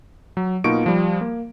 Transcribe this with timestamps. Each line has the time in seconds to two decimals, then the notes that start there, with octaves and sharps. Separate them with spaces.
0.37 F#3
0.64 B2 A#3 D#4 F4 C#6 D7
0.86 F3 G3
1.21 A#3